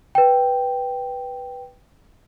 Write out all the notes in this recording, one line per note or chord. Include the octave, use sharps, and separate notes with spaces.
B4 G5